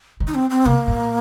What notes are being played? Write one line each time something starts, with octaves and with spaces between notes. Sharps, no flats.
D#3
D#4
C4
C4
C3 A#3
A#2